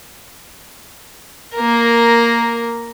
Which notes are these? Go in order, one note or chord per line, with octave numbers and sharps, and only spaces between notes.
A#3 A#4